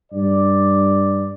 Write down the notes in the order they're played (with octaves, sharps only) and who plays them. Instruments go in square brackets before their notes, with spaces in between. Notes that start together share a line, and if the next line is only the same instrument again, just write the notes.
[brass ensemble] G2 D5